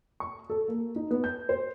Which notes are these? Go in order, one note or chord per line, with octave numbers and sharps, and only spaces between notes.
C#6
A4
A#3
D#4
B3
G6
C5